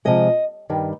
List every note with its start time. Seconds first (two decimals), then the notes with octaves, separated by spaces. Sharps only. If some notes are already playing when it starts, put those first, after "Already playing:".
0.05 C3 F3 G#3 D#5
0.70 G2 D#3 G3